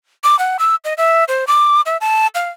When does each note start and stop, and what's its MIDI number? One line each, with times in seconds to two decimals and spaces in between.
0.24 0.38 86
0.39 0.57 78
0.59 0.75 88
0.84 0.94 75
0.98 1.24 76
1.28 1.45 72
1.47 1.81 86
1.86 1.97 76
2.01 2.27 81
2.35 2.50 77